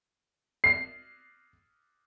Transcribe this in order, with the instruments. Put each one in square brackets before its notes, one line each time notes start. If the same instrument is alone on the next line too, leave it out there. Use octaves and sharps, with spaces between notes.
[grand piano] C7